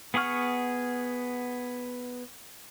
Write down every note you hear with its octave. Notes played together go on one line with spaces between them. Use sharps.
B3 G#4 F#5 C#6 F6